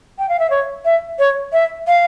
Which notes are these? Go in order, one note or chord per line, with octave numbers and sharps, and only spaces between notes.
G5
F5
E5
C#5
E5
C#5
E5
F5